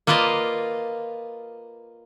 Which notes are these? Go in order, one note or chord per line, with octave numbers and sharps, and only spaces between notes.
A#3 F4 B4 D5 D#5 F5